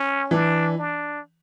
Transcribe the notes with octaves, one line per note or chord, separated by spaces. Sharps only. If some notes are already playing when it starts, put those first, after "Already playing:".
Already playing: C#4
E3 D4
D4